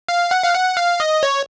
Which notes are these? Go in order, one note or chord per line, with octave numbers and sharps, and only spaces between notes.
F5
F#5
F5
F#5
F5
D#5
C#5